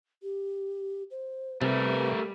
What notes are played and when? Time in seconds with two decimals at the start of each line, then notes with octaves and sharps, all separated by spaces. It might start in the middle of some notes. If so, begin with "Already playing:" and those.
0.23 G4
1.11 C5
1.62 C3 G3 A3 A#4 B4